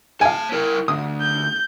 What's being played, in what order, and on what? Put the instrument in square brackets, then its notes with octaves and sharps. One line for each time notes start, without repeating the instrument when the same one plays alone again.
[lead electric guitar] C#5 A5 [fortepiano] F5 G#5
[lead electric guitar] E4 A#4
[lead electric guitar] D2 [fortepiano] D#6
[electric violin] G6